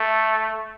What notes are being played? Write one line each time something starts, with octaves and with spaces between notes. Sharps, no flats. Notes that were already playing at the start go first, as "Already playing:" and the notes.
Already playing: A3